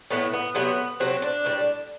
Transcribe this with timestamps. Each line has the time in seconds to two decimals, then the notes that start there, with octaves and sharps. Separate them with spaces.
0.11 A2 E3 A3 B3
0.33 B3
0.55 C3 F#3 A3 B3
1.00 C3 F#3 A3 C4
1.22 D4
1.45 A2 E3 G3